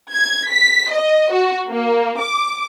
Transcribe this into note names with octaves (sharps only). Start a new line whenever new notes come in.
G#6
B6
D#5
F#4
A#3
D6